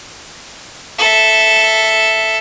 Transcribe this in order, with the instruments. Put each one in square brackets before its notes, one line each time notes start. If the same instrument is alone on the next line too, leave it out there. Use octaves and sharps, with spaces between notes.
[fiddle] A4 E5